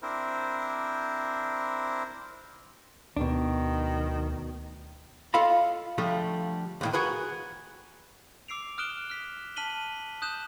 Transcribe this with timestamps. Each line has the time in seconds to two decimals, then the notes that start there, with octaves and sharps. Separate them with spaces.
0.02 C4 D4 E4 A#4 C5
3.17 D2 B2 D#3 D4
5.34 F4 A4 D#5 F5 B5
5.98 D3 F3 G3 A3
6.81 D#2 A2 D#3
6.93 F#4 G#4 A#4 B4
8.48 D6 E6 C7 D7 F7
8.78 D#6 F6 F#6 D7 E7 G7
9.10 F6 B6
9.56 A5 F6 B6 D#7 F#7 G7
10.22 D#6 F#6 G6 E7